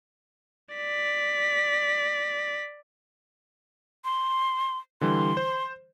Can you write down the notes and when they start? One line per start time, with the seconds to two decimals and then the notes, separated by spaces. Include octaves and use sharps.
0.75 D5 B6
4.05 C6
5.01 D3 E3 G3 C6
5.37 C5